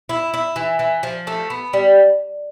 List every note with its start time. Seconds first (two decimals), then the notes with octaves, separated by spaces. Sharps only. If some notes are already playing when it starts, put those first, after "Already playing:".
0.09 E4
0.34 E4
0.56 E3
0.79 E3
1.03 F3
1.27 A3
1.50 B3
1.73 G3